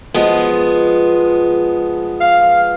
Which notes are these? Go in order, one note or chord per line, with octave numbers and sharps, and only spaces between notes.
F3 G#3 B3
F5